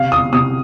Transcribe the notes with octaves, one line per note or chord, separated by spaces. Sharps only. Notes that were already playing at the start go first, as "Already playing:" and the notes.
Already playing: C3 F5
D#6
C3 D#6